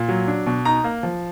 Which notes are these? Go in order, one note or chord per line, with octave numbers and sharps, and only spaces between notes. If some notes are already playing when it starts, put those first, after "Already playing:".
Already playing: A#2
F#3
D4
B2
D#4 A#5
A#3
F3